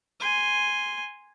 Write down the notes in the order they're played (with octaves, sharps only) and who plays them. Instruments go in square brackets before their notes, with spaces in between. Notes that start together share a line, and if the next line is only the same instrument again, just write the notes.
[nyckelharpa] G#5 C6